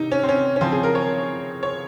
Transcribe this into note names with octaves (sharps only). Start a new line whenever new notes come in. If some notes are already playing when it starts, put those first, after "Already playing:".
Already playing: C3 D#4
C#4
C4
C#4
C#4
C#3 F3 C4
G#4
A#4
C#5
C#5